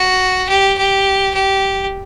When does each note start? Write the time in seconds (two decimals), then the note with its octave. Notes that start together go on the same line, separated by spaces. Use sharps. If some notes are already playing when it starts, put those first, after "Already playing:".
Already playing: F#4
0.49 G4
0.78 G4
1.34 G4